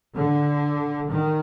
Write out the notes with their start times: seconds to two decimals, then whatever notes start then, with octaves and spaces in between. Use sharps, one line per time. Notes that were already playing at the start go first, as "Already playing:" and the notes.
0.15 D3
1.09 D#3